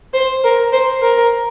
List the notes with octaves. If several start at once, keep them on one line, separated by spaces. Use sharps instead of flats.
C5
A#4
C5
A#4